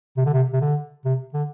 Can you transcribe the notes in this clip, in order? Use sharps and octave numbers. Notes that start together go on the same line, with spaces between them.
C3
D3
C3
C3
D3
C3
D3